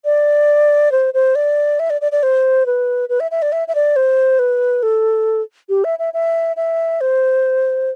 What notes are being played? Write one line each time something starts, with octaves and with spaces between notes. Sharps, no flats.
D5
C5
C5
D5
E5
D5
D5
D5
C5
B4
B4
E5
E5
D5
E5
E5
D5
C5
B4
A4
G4
E5
E5
E5
E5
C5